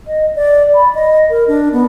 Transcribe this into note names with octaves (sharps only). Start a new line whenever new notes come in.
D#5
D5
B5
D#5
A#4
D4
B3